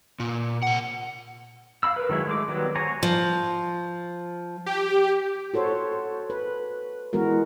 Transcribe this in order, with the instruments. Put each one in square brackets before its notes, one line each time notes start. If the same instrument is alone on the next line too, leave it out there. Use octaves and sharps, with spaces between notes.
[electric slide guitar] A#2
C3 F#5
[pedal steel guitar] F5 F#5 B5 E6
A#4 B4
D#3 F#3 G#3 E4
G#3 A3 D6
D#3 F#3 G3 B3
C5 C#5 F#5 G#5 A#5
[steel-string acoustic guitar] F3
[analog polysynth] G4
[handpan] F#4 A4 C5 C#5
B4
E3 G#3 B3 F#4 A#4